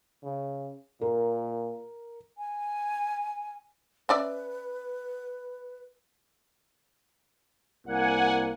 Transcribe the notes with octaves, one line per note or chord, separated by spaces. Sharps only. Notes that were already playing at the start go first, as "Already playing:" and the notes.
C#3
A#2 A#4
G#5
C#4 B4 D5 E5
C2 G3 A#3 F#5 G#5